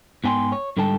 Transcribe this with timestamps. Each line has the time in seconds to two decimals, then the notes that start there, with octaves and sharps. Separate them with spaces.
0.24 G#2 B3 G5 G#5 C6
0.52 C#5
0.77 G#2 D3 G3 A4 G5 A5